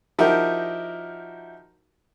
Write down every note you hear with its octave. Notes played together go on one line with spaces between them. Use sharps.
F3 D#4 E4 F#4 G4 A#4